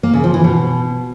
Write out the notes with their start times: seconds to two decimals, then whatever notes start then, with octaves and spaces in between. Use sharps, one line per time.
0.03 A#3
0.14 C#3
0.24 F3
0.34 E3
0.44 B2